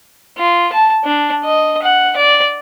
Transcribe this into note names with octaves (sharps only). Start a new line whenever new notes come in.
F4
A5
D4
D#5
F#5
D5